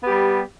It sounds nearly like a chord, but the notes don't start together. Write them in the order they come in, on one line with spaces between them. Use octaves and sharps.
B3 G4 G3